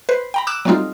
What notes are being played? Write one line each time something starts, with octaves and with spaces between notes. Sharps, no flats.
B4 C5
G5 A#5 B5
D6 E6 F#6 E7
F#3 G3 A3 C4 D#4 F4